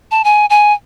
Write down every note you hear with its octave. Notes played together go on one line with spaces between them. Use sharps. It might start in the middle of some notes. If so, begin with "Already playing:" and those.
A5
G#5
G#5